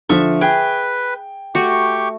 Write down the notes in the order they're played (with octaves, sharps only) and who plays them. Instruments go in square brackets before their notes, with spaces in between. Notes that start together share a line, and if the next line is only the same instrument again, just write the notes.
[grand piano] D3 F3 [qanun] E5 C#6
[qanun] G#4 [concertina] B4 [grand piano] G5
[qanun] A3 F#4 [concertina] G4 C#6